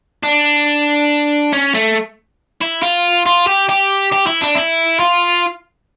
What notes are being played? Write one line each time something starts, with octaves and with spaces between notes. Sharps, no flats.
D4
C#4
A3
E4
F4
F4
G4
G4
G4
E4
D4
E4
F4